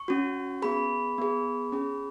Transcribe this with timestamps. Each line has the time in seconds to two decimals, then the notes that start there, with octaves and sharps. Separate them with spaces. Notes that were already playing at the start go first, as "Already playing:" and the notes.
Already playing: C#6
0.08 C#4 F#4
0.62 B3 G#4 B5
1.18 B3 G#4
1.72 C#4 G#4